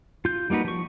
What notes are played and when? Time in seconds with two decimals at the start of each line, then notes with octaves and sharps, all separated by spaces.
0.25 F4 G6
0.50 G3 A#3 D#4 F#4 B4
0.65 F3 C#6